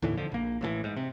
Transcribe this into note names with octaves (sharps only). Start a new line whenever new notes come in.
D#2 A2 D3 E3
F2 D3 F3
A#1 A#3
A1 A2 C#3 E3
G#2
C3